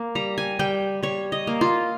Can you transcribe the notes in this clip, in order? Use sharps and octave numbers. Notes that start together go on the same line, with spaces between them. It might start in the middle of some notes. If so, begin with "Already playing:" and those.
Already playing: A#3
G3 A#5
G#5
G3 G5
G3 C#5
D#5
A#3
F4